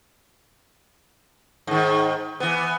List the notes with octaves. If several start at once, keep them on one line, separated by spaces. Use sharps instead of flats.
G#2 D#3
E3 B3